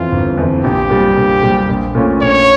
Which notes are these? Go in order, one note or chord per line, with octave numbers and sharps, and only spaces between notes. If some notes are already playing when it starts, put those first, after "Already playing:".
Already playing: F2 E3 F4
G1
F2 E3
A#1 G4
A#2 G3
A#1
A#2 G3
A#1
A#2 A3 C#4 F4
A#1 C#5